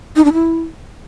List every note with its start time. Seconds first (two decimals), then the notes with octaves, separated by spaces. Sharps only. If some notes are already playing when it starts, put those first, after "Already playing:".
0.16 D#4
0.25 D4
0.33 E4